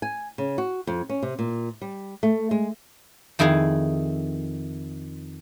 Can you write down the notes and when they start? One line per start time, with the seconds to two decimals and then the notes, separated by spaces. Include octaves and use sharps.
0.02 G#5
0.38 C#3
0.58 F#4
0.87 F2
1.09 C#4
1.23 C3
1.39 A#2
1.82 G3
2.23 A3
2.51 G#3
3.39 F2 D#3 E4 G#4 F5